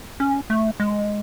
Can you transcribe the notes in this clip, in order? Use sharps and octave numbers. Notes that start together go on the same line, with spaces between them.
C#4
A3
G#3